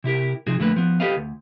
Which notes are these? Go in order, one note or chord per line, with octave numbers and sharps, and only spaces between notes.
C3 E4 G4 A#4
C3 F3 D#4 F4 F#4 G#4
F2 D3 A3 A#3 B4
F3 B3
G4 A4 B4 D#5 F5
D2